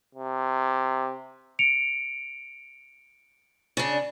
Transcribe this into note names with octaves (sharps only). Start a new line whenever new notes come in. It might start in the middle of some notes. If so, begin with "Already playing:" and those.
C3
C#7 D7 F7
C#3 D4